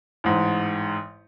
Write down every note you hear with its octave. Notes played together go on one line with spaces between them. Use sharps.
A1 G#2